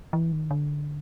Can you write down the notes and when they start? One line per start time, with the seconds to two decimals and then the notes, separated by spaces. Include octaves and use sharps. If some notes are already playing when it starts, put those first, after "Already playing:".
0.13 E3
0.32 D#3
0.51 D3